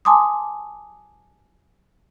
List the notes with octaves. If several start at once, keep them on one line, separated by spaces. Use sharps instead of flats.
G#5 A5 C6 D6 D#6